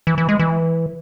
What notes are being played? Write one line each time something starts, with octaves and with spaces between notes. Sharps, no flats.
E3
E3
G#3
E3